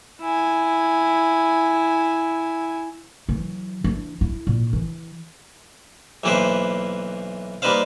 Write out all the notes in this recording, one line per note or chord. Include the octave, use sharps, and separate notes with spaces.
E4 G#5
E3 F#3
E3 D4
E4
A#2
E3
B1 E3 A#3 G4 B4 C5
G3 A#3 D#4 B4 C5 F5